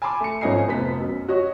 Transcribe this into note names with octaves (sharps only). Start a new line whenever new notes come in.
G#5 A5 B5 C6 D6
A3 C#7
G#1 F3 C#4 D#5 G#5 C7
F1 B3 C5 B6
F#2
F#4 C#5 D#5